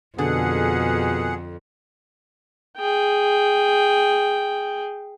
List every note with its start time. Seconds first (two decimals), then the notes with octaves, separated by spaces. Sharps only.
0.18 F2 B2 D3 G#4 F#5
2.78 G#4 G5